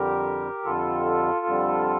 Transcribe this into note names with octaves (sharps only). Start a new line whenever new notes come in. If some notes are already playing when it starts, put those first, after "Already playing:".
Already playing: F2 D3 G3 G4 A#4
F2 D3 G3 F4 A4
F2 D3 G3